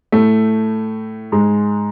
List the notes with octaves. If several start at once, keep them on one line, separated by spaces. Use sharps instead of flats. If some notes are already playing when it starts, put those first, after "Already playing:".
A2 A3
G#2 G#3